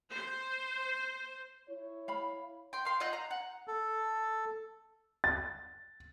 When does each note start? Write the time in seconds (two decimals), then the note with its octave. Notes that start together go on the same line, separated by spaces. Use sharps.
0.12 C5
1.68 E4 C#5
2.08 F5 B5
2.73 G5 C6
2.85 F5 C6
3.00 F4 D#5 F#5 G6
3.13 A#5
3.31 F#5
3.68 A4
5.24 A6